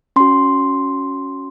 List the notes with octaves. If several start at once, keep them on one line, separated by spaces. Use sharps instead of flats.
C#4 F#4 C6